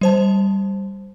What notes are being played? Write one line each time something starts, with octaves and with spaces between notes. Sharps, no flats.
G3 C5 A5